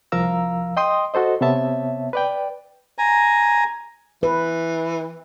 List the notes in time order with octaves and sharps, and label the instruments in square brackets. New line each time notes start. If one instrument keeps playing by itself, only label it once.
[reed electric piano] C2 F3 A#4 F5 A#5 E6
D#5 G5 C6 D#6
F#4 A4 C5 D#5
C3 B3 C#5 E5 A5
B4 D5 G5
[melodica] G#5 A#5
[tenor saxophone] E3 [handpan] B4